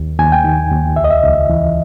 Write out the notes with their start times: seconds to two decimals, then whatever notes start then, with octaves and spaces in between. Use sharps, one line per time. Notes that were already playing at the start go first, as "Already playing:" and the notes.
Already playing: D#2
0.19 D#2 G#5
0.32 G5
0.44 D#3
0.71 D#2
0.96 C#2 E5
1.04 D#5
1.11 E5
1.23 C#2
1.50 E3